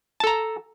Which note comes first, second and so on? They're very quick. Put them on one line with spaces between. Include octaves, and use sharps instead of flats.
A5 A4 A#5